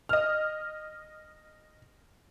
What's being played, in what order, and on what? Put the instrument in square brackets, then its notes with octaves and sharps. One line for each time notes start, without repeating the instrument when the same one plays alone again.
[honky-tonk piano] D#5 F6